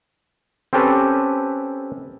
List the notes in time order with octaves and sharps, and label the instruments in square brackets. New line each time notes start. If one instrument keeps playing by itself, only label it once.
[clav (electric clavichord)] C4 C#4 G4 A4 B4